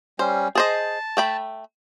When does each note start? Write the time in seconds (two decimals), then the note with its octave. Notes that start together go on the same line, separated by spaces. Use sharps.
0.19 G3 C#4 C5
0.55 G#4 C5 D#5 A5
1.17 A3 G5 B5